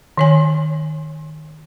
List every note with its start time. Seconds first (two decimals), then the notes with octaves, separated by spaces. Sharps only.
0.17 D#3 C#5 G#5